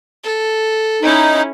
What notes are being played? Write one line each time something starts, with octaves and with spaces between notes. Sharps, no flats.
A4
C#4 D#4 E4